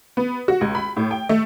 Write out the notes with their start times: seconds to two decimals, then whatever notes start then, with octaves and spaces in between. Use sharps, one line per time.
0.17 B3
0.48 F#4
0.61 C#2
0.75 B5
0.97 A2
1.11 G5
1.29 A3